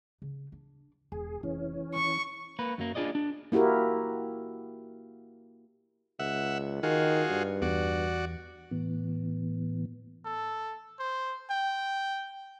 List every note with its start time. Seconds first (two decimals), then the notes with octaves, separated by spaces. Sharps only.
0.22 C#3
0.52 D4
1.12 E1 G#4
1.43 F1 E3 C#4
1.94 D#3 D#4 C#6
2.59 A#3 B4
2.78 F#2 F#3 A#3
2.95 D4 F4 G#4 D5 D#5
3.15 D4
3.52 A#3 E4 F#4 G4 A#4
6.19 C#2 E5 F#5
6.83 D#3 F4 F#4 G#4
7.30 G2
7.62 E2 F#4 D5
8.71 A2 E3 B3
10.25 A4
10.99 C5
11.50 G5